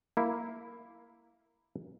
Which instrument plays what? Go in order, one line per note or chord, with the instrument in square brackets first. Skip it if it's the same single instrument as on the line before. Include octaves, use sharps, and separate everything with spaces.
[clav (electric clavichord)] A#3 E4